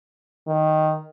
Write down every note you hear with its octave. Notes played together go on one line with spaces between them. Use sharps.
D#3